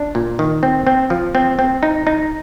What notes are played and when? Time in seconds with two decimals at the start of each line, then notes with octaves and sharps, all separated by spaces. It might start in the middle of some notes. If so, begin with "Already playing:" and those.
Already playing: D4
0.15 A#2
0.39 D#3
0.63 C4
0.87 C4
1.10 F3
1.35 C4
1.59 C4
1.83 D#4
2.07 D#4